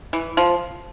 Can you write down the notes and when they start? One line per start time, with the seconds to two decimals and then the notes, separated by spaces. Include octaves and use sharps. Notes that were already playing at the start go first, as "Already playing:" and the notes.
0.13 E3
0.37 F3